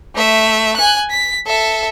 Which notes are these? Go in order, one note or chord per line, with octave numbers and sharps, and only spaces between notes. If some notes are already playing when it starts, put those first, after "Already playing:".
A3 E5
G#5 F#6
B6
A4 E5